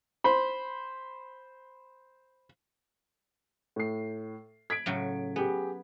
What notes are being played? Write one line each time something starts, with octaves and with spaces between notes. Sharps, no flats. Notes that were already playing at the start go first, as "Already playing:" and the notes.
C5 B5
A2 C7
B5 G#6 B6 D7
A2 C#3 F#3
B3 G4 G#4